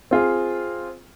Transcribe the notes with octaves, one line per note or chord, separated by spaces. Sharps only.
C4 F4 G#4